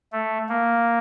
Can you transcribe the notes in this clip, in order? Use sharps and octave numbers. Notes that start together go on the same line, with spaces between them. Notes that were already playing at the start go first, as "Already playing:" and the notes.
A3
A#3